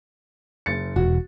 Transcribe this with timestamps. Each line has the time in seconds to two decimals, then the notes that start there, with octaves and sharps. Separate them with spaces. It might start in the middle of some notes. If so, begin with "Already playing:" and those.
0.66 F#1 A6 C#7
0.96 E1 F#4